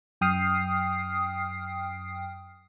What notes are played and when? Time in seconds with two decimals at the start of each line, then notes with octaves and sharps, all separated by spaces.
0.21 F#2 G5 D#6 F6 C7